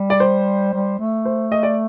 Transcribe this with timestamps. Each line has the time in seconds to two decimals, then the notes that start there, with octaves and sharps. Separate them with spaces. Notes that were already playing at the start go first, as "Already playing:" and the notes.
Already playing: G3
0.10 D5
0.20 C5
0.73 G3
0.99 A3
1.25 C5
1.52 D#5
1.63 D5